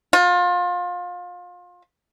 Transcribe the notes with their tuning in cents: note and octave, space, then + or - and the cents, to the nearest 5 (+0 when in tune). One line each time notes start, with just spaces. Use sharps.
F4 +30